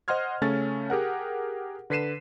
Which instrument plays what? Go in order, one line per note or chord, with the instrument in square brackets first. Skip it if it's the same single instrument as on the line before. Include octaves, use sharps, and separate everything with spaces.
[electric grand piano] C5 D#5 F#5 C6 F6 G#6
C#3 A3 C#4 A4 A6
G4 G#4 A#4 F#5
D3 B4 B6 C7 D#7 E7